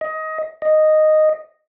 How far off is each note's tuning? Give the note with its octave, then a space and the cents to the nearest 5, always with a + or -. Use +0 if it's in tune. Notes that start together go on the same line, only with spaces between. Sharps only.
D#5 +20
D#5 -5